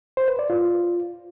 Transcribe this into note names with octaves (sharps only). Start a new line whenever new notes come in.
C5
B4
D5
F4